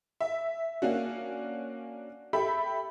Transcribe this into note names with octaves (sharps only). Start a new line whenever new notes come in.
E5
A#3 C#4 D4 F#4
G4 A4 E5 B5